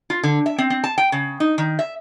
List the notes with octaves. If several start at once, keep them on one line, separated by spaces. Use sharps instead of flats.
F4
D3
E5
C4
C4
A5
G5
C#3
D#4
D#3
E5